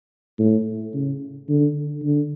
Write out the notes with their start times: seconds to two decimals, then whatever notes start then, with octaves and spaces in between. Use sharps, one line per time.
0.39 A2
0.94 C#3
1.49 D3
2.03 D3